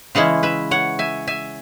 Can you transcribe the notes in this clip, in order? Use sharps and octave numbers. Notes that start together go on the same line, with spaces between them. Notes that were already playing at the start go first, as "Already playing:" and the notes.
C#3 E3 G#3 C#4 E4 G#4 C#5
B4 E5
C#5 F#5
E5 G#5
E5 G#5